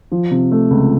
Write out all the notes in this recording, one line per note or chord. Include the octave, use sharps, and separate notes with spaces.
F3
C3
A3
C#2